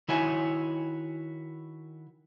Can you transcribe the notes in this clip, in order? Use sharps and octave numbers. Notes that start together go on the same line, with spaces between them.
D#3 E4 F#4 C#5 G#5